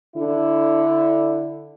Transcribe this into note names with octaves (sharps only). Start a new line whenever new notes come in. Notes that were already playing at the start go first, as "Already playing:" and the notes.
D3 E4